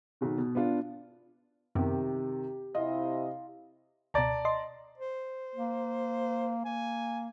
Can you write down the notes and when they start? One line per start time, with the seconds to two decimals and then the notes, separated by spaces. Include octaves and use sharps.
0.21 B1 D#3
0.38 B2
0.55 B3 D4 F4
1.75 F#2 C3 D#3 B3 G4
2.75 C3 E4 F4 D#5
4.14 C#2 B2 D5 A5 A#5
4.45 D#5 C6
4.98 C5
5.55 A#3
6.65 A#3 G#5